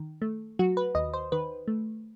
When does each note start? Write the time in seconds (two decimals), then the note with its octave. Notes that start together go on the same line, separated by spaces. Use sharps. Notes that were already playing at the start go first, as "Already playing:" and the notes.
Already playing: D#3
0.22 A3
0.59 F#3 F#4
0.77 B4
0.95 D#2 D#5
1.13 C5
1.32 D#3 B4
1.68 A3